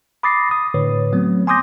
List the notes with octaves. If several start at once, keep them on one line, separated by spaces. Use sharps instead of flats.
B5 D6 D#6 A6 A#6 C7
D#6
A2 D3 B4 C#5
F#3 A3 B3 C4
G#5 C6 D6 D#6 G6 A#6